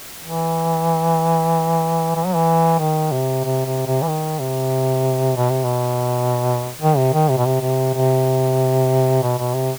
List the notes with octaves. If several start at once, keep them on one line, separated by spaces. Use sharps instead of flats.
E3
E3
F#3
E3
D#3
C3
C3
C3
C3
E3
D#3
C3
B2
C3
B2
D#3
C3
D#3
C3
B2
C3
C3
C3
B2
B2
C3